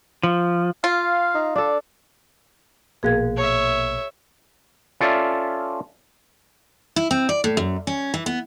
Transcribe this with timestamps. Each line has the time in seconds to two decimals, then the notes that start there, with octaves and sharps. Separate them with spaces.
0.23 F3
0.84 F4 F5
1.35 D#4
1.55 D4 A4 D5
3.03 A#1 B2 A#3 G#4 F5 G#6
3.37 C#5 E5
5.01 C#4 F4 A4 D5 E5
6.96 E4
7.11 C4
7.29 D5
7.44 A2
7.57 F#2
7.87 C#4
8.14 E3
8.26 B3